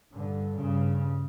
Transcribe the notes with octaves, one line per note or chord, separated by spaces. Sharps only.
G2 D3
G2 C#3